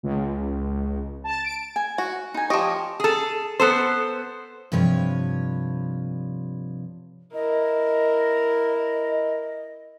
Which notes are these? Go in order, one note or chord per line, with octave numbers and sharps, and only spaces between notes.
C#2
A5
D7
G#5
F#4
D#4 G#5
F3 G4 D#5 C#6
G#4 A4
B3 A4 C5
G2 C3 F3 C#5
E4 A#4 D#5